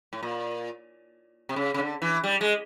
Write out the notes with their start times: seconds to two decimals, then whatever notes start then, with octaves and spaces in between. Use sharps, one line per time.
0.13 A2
0.23 A#2
1.49 C3
1.56 C#3
1.74 C#3
1.78 D3
2.02 E3
2.24 G3
2.41 G#3